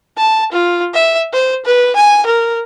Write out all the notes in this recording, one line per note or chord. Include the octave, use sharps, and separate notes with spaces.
A5
F4
E5
C5
B4
G#5
A#4